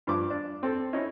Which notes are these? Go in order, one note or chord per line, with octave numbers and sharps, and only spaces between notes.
G2 F3 D6
D4
C4 A4
C#4 D#4 E4